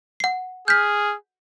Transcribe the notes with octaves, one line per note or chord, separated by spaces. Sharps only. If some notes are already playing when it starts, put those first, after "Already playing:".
F#5 C7
G#4 F6 G6 B6